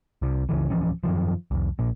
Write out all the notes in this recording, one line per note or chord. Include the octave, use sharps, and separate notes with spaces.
C2 C3
C#2 C#3 E3
D1 E3 F3 C#4
F#2 A#2 D#3 F3
C2 F2
A#1 A#2